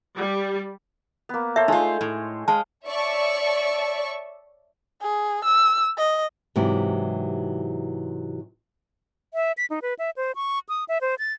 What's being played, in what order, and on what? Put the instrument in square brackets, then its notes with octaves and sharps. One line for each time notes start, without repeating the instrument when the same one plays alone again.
[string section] G3
[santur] A#3 B3
[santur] A4 C5 C#5 [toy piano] E5
[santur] G#3 [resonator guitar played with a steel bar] A3 F4 [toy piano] D#4
[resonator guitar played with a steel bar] A2
[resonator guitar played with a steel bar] G#3 [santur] F5 [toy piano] A5
[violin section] C#5 D5 E5 A5 C#6
[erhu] G#4
E6
D#5
[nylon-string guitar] G#2 C3 E3 F#3 E4 G4
[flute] E5
B6
D#4
B4
E5
C5
C#6
D#6
E5
C5
A6